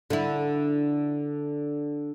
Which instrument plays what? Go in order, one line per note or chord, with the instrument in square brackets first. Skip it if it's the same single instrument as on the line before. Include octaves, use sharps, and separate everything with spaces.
[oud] D3 E4